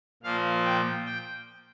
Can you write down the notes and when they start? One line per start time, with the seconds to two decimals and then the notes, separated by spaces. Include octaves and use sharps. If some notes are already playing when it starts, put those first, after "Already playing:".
0.23 A#2 F3 A#3 F5
0.64 G5
1.06 G5